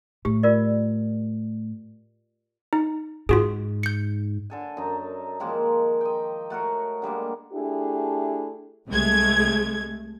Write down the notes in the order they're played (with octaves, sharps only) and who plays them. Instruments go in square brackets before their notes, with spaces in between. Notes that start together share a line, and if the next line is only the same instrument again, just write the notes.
[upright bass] A2 [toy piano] G4
[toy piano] F4 A#4 D5
[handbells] D#4
[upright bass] G#2 [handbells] F4 F#4 G#4
[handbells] G6 C#7
[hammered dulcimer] D3 A4 G#5
F#2 D#4
D#3 F3 G#3 A#3
D#5 G5
A3 F#4 A#4 C#5
D3 G3 G#3 A#3
[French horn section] A3 D4 E4 G4 G#4
[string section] C2 G#3 A3 G#6